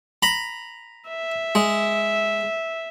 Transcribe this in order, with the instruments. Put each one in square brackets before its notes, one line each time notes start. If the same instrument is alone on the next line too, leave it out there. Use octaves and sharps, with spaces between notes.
[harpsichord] A#5 B5
[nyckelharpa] E5
[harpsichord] G#3